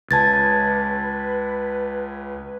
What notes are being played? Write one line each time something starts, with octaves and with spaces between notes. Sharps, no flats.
C#2 B4 A5 G#6 A6